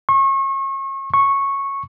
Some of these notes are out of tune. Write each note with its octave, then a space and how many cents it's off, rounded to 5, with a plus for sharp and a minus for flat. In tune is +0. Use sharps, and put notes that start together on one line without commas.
C#6 -35
C#6 -10